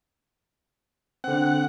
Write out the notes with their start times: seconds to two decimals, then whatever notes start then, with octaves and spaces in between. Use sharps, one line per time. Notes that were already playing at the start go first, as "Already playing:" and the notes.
1.24 D3 C4 F#5